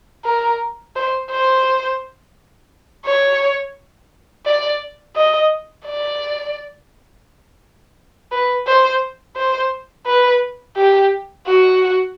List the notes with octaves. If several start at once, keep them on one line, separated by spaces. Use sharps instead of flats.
A#4
C5
C5
C#5
D5
D#5
D5
B4
C5
C5
B4
G4
F#4